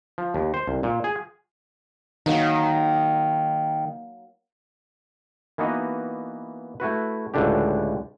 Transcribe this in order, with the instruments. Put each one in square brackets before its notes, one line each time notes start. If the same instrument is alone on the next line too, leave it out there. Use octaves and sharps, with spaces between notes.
[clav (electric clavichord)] F3
D#2
C5
C2
A#2
G#4
[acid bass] D#3 [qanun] F#3 A#3 D#4
[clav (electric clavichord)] E3 A#3 B3 D#4 F#4 D#5
A3 E4 F#4 B4
C#2 A2 D3 D4 G4